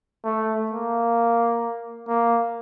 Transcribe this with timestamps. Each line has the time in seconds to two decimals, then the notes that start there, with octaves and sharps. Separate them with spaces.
0.24 A3
0.71 A#3
2.08 A#3